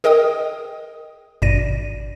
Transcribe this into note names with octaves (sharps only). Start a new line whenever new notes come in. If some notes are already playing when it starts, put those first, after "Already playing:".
G#4 A#4 D#5 G5 D#6
G#1 G2 B2 D5 A#6 D#7